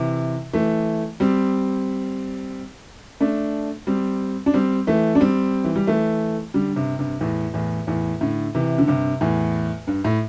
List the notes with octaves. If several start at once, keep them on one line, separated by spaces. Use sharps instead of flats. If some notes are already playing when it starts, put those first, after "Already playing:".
Already playing: C3 E3
E3 A3
G3 C4
A3 D4
G3 C4
D4
G3 C4
E3 A3
D4
G3 C4
E3
G3
E3 A3
D3 G3
G2 C3
G2 C3
E2 A2
E2 A2
E2 A2
A2 D3
C3 E3
D3
G2 C3
E2 A2
G2
A2